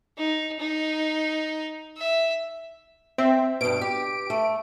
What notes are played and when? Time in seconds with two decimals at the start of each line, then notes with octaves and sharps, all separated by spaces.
0.18 D#4
0.59 D#4
1.97 E5
3.18 C4 E5
3.61 G2 B2 D7
3.81 G4
4.30 A3